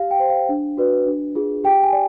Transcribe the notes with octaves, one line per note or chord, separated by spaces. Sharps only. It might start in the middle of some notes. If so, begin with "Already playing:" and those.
Already playing: G4 F5
G5
C5
F5
D4
F#4 B4 D5
D4
F4 G#4
G4 G5
G#5
D5